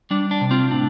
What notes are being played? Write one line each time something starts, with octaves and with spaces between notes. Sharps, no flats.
G3 D4
D4
C3
C4 F4
A2 D4